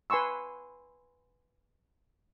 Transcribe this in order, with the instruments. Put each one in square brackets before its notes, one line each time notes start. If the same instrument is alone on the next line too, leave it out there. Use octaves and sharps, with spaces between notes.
[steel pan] B4 G#5 C6 C#6 E6